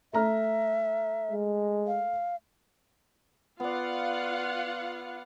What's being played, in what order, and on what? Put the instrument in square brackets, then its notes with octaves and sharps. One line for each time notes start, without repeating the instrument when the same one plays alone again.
[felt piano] A3 A#5 F6 [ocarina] E5
[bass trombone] G#3
[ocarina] F5
[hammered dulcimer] B3 D5 [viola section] F4 F5 F#5